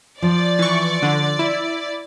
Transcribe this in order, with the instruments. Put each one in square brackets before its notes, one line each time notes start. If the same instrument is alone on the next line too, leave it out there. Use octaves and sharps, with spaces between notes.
[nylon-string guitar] F3 [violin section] D5
[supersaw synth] E3 C#6
D3
E4